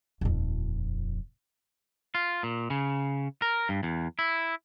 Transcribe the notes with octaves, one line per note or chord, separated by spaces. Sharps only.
D#1 F2
F4
A#2
C#3
A#4
G2
E2
E4